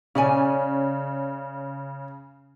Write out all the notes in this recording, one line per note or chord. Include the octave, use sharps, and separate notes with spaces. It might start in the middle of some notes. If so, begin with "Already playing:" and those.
C#3 C#4 D5 G#5